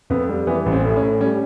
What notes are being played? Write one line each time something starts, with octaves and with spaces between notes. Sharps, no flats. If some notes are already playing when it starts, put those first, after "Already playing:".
F2 B3
G3
E3 B3
A1
C4
A2
C#4
A2
G3 C#4